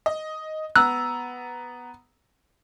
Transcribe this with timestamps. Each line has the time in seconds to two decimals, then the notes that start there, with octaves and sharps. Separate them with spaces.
0.06 D#5
0.76 B3 A#5 E6 F#6